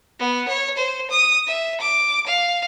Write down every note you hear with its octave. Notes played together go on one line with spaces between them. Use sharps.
B3
C#5
C5
D#6
E5
D6
F5